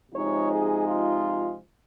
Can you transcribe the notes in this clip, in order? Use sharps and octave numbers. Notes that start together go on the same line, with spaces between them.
C3 F3 G#3 D#4 C#5
G#4
F4